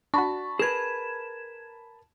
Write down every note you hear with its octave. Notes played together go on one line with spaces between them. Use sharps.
D4 F#4 A5 B5 C#6
G#4 A#4 B4 G#6 E7